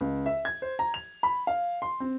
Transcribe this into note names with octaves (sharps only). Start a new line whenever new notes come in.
C#2
E5
G#6
C5
A#5
F7
B5
F5
C6
C4